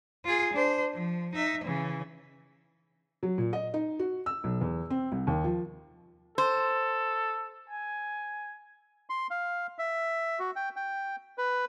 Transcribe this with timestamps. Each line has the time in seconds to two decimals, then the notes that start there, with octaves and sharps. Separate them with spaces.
0.25 F4 G#4
0.53 D4 C5
0.94 F3
1.34 D#4 E5
1.64 C#3 E3
3.23 F#3
3.38 A#2
3.53 D#5
3.74 D#4
3.99 F#4
4.26 E6
4.44 B1
4.61 E2
4.90 C4
5.12 C2
5.27 D#2
5.44 F3
6.38 A4 C5
7.70 G#5
9.10 C6
9.31 F5
9.79 E5
10.39 F#4
10.56 G5
10.76 G5
11.38 B4